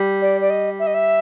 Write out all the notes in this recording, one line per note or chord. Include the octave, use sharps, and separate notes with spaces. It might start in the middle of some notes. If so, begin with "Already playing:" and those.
Already playing: G3
D5
D5
D#5
E5
D#5
E5